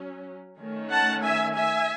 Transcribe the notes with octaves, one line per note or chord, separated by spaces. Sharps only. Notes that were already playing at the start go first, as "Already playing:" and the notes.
Already playing: F#3 C#4
D#3 A3 C#4
F#5 A5
E5 G#5
E5 G#5